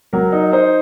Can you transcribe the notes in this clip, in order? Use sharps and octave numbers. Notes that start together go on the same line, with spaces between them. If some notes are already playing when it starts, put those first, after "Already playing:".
F#3 A#4
D#4
D#4 C5